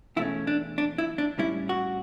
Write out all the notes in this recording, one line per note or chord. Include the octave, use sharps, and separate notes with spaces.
E2 B2 A3 C#4 E4
D4
D4
E4
D4
A2 G3 C#4 E4
F#4